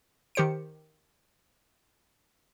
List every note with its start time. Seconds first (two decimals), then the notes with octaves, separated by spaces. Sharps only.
0.35 D#3 G4 C5 C#7 D7